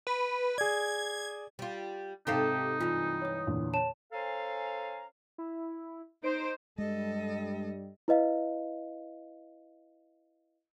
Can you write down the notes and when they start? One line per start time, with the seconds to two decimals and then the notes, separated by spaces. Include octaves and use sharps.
0.07 B4
0.58 G#4 D5 G#6
1.59 G3 F4
2.27 G#2 C3 D#4 G4 A4 F5
2.80 G2 E3 F4
3.22 C#5 D#6
3.47 E2 A#2 D3
3.73 C#5 A5 E7
4.13 C#4 A4 C5 F5 G#5 A#5
5.38 E4
6.24 D#4 C5 D7
6.78 G2 G3 G#3 A4 D#5
8.08 E4 B4 D#5 F5